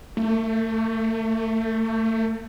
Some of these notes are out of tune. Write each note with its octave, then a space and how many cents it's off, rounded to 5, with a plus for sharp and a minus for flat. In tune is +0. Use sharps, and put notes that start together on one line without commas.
A3 +30